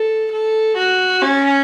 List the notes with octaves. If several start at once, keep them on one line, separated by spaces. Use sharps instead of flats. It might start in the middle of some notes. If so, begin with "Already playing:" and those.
Already playing: A4
A4
F#4
C#4